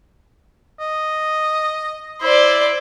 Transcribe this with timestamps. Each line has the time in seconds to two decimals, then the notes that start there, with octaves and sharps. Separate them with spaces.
0.80 D#5
2.22 E4 C5 D5